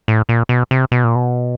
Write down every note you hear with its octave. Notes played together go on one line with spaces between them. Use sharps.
A2
A#2
B2
C3
B2
A#2
B2